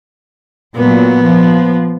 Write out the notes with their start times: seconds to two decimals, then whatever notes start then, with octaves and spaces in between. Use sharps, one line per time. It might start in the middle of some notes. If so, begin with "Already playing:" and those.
0.76 A#2 F#3 B3
1.23 F3